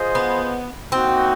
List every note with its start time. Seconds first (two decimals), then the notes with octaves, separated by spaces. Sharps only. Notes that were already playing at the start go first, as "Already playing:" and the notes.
Already playing: F4 G#4 C5 D#5
0.15 B3
0.92 A#3 C4 D#4 F#4